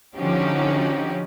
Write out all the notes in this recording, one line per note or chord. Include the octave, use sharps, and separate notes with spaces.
D3 F3 C#4 D#4 F#4 G4